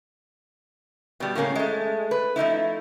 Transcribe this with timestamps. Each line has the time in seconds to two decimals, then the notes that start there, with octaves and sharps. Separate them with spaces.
1.20 B2 G3
1.35 A2 C#3 A#3 C#4
1.55 G#3 A3
2.11 B4
2.36 F3 A3 D#4 E4